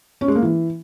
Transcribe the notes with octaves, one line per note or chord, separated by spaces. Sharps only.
C#4
G#3
A#3
E3